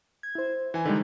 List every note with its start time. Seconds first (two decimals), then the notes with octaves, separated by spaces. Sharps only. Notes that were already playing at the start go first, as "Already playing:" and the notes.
0.23 G#6
0.35 E4 C5
0.74 E3 G#5
0.85 D3 D#3 G3 G#3 D#4